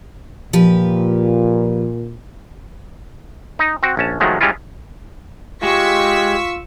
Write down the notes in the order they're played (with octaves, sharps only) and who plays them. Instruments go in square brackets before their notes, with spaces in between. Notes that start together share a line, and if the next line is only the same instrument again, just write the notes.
[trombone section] A#2 [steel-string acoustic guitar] F3 G4 B4
[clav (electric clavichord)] D#4
C4 F#4
A#1 C#4 A5
D#3 F3 F#3 G#3 A3
G3 G#3 C#4 E4 F4
[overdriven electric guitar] G#3 [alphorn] F4 [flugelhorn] G4 [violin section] C#6 E6 B6